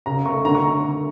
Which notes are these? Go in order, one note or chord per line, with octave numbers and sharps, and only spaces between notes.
C#3 A#5
A3 C#6
D3 A#5
C#6